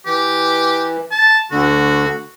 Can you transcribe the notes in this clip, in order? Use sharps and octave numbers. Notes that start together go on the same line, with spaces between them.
E3 G4
A5
D2 D3 F#4